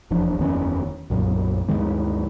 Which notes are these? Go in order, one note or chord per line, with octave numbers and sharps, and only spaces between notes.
F1 E2 F3 D4
F#1 E2 D#3 C#4
B1 F#2 A#2 F#3
D2 G2 D#3 G#3